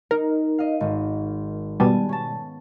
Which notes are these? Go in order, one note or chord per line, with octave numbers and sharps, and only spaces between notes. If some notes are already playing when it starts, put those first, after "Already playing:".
D#4 A#4
D#5 F5
G#1
B2 G3 B3 G#5 A5
C#4 A5